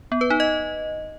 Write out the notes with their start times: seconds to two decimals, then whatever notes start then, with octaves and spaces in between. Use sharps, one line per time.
0.12 B3
0.21 B4
0.30 D#4
0.40 D#5